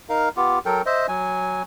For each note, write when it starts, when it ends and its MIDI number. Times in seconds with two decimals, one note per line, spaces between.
0.09 0.29 63
0.09 0.29 70
0.09 0.29 77
0.37 0.59 59
0.37 0.59 65
0.37 0.59 67
0.66 0.82 54
0.66 0.82 69
0.66 0.82 70
0.66 0.82 79
0.86 1.07 72
0.86 1.07 75
0.86 1.07 76
1.08 1.63 54
1.08 1.63 80